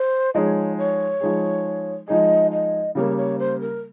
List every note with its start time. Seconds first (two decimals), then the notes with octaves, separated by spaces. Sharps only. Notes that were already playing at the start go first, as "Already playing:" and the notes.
Already playing: C5
0.34 F3 G#3 D#4 G#4 C#5 D#5
0.77 C#5
1.20 F3 G#3 D#4 G#4
2.08 F3 G#3 D#4 G#4 D#5
2.51 D#5
2.95 C#3 G3 A#3 C#5
3.17 C#5
3.39 C5
3.60 A#4